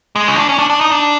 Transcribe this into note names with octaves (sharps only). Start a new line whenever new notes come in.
G#3
C#4
D4
C#4
D4
D4
D#4
D4